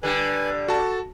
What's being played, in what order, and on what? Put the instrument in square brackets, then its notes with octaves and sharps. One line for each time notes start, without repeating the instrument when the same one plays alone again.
[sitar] D3 G3 [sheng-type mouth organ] B4 G#5
[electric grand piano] F#4 A5 [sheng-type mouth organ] A4